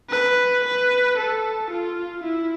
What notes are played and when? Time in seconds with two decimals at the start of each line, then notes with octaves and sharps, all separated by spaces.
0.10 B4
0.64 B4
1.17 A4
1.70 F4
2.24 E4